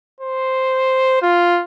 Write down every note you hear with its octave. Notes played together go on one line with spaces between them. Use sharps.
C5
F4